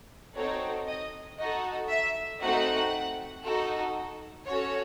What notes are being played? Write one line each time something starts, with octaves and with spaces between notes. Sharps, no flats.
C4 D#4 F#4 A4 C#5
D#5
D#4 F#4 A4 D#5
E5
A3 C4 D#4 F#4 F#5
D#4 F#4 A4
C#4 F#4 A4 C#5